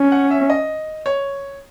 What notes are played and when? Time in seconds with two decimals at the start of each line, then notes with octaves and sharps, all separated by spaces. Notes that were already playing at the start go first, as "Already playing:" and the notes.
Already playing: C#4
0.12 F#5
0.31 E5
0.50 D#5
1.06 C#5